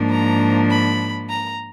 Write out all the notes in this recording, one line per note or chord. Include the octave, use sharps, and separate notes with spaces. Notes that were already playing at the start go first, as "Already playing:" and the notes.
Already playing: G#2 F3 A#3 D4
A#5
B5
A#5